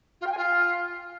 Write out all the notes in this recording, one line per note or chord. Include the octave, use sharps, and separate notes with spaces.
F4
G5
G#5
F4